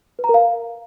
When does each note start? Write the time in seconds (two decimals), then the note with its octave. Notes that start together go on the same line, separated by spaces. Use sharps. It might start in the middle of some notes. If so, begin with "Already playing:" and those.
0.19 B4
0.24 A#5
0.29 A#4
0.34 F5